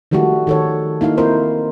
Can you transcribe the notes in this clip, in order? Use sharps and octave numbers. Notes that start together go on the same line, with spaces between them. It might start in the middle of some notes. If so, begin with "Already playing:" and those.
D#3 F3 G3 A3 F#4 A4
D#3 A4 C#5
A#3 D#4 E4 F5
C4 E4 F4 A#4 C5